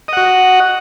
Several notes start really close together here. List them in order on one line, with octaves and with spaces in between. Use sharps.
D#5 F#5 F#4